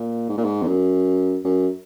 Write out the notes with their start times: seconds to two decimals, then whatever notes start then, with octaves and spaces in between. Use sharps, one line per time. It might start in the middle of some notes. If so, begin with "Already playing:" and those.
Already playing: A#2
0.29 G#2
0.38 A#2
0.45 G#2
0.62 E2
0.68 F#2
1.44 F#2